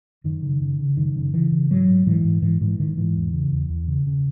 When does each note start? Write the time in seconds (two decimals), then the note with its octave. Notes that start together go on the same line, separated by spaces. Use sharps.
0.24 F#2 D#3
0.42 C#3
0.62 C#3
0.79 C#3
0.97 F#2 D#3
1.16 C#3
1.33 C#3 E3
1.52 C#3
1.70 G#2 F#3
1.88 G#2
2.07 G#2 E3
2.24 G#2
2.42 G#2 E3
2.61 G#2 E3
2.79 G#2 D#3
2.97 G#2 E3
3.16 E2
3.33 C#3
3.52 E2
3.69 E2
3.88 C#3
4.07 C#3